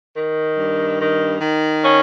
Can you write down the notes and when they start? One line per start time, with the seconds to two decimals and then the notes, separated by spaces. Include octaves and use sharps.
0.13 D#3
0.56 G2
0.98 D#3
1.40 D#3
1.82 C#4